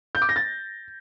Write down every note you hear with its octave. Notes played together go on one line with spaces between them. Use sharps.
G6
D6
A#6
A6